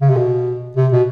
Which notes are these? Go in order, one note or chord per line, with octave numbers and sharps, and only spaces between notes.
C#3
C3
B2
C3
B2